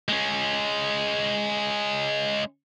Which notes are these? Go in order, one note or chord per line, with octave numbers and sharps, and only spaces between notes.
G#3 C#4